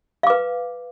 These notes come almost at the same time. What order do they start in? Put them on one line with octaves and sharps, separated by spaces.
F5 D6 B4